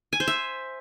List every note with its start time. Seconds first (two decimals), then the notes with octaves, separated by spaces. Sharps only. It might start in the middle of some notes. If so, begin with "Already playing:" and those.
0.13 G#5
0.20 C5
0.28 E5